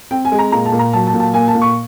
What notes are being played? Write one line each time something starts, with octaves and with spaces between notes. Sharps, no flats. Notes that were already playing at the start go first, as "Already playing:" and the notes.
C4 G5
G#5
G#3
A#5
A#2 A#5
A5
A#2
A#5
F#3 A5
A5
A#2
A5
A#3 G#5
A5
A#2
C#6